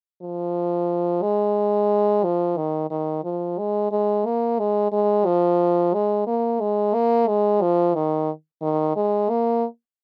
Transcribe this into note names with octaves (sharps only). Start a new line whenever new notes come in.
F3
G#3
F3
D#3
D#3
F3
G#3
G#3
A#3
G#3
G#3
F3
G#3
A#3
G#3
A#3
G#3
F3
D#3
D#3
G#3
A#3